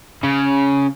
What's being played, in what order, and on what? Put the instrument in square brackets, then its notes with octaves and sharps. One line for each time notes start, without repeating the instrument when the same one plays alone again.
[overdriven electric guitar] C#3